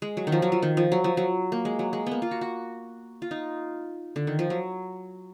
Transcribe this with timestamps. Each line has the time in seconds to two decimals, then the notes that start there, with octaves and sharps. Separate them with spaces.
0.02 G#3
0.17 F#3
0.27 D#3
0.32 F3
0.42 F#3
0.52 F3
0.63 D#3
0.77 F3
0.92 F#3
1.04 F3
1.17 F#3
1.52 A#3
1.65 G#3
1.79 F#3
1.93 G#3
2.06 A#3 B3
2.22 F4
2.31 F#4
2.41 F#4
3.22 F4
3.31 D#4
4.16 D3
4.27 D#3
4.39 F3
4.50 F#3